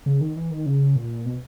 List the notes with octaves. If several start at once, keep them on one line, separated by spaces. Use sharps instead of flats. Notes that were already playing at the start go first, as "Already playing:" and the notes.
C#3
D#3
E3
D#3
C#3
A#2
B2